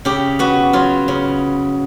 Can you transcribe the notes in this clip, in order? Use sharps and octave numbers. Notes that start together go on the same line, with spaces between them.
C#3 G4
B3 F#4
F#3 F4
C#3